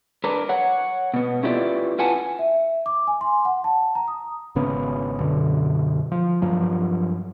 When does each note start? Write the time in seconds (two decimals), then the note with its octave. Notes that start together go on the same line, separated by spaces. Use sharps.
0.24 D4 A#4 B4
0.49 C#5 F#5
1.14 B2 B3
1.43 C#4 E4 F4 G4 B4 D5
1.99 F4 B4 F#5 G#5 A5
2.39 E5
2.86 D6
3.07 G#5
3.21 C6
3.45 F#5
3.64 A5
3.95 A#5
4.08 D#6
4.55 G#1 C#3 B3 C#4
5.20 F#2 B2 D3
6.12 F3
6.42 G2 F3 F#3